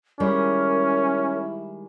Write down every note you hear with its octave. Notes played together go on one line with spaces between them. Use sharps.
D#3 G3 G#3 C#4 E4 A#4